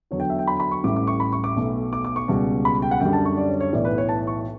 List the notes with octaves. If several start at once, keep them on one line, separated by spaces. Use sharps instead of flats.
E2 D3 F#3 C#5
G5
E5
G5
B5
B5
C#6
A1 A2 G3 D6
D6
C#6
B5
C#6
D6
B1 B2 A3
D6
D6
C#6
C#2 B2 G3
B5
G5
F#5
F#2 D3 G3 G5
A5
C#6
D5
C#5
C#5
B1 A2 E3 D5
B4
C#5
A5
C#6